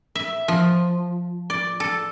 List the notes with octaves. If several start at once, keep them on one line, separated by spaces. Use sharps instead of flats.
E5
F3
D5
A4